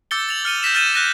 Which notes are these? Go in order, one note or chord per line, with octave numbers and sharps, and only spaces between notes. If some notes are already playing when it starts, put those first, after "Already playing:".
D6 E6 G6 A6 C#7 G7
A6 F7 F#7
F6 C#7 D#7 G7
G6 A#6 B6 E7
F6 G6 A6 D#7 E7
F#6 A#6 D#7